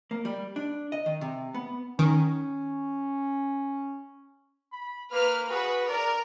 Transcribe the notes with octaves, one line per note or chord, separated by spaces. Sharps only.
A#3
G3
D4
D#5
D#3
C3
B3
D#3 C#4
B5
A#3 B4 F6
F#4 G#4 B4
A#4 D5